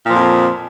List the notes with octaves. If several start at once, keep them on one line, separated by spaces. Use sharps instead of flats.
F2 A#2 F3